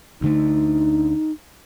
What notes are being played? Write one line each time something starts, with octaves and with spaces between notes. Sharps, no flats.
D2 D3 A3 D#4